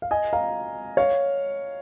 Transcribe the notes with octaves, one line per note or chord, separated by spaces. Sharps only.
F5
D#5 G#5
F5 A#5
C#5 F5